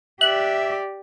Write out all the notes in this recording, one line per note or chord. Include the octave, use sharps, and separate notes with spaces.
G4 D5 E5 F#6